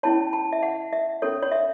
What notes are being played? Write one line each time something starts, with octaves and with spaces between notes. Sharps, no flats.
C#4 E4 C#5 A5
A5
E5
F#5
E5
C#4 A4 C#5
C#5
E5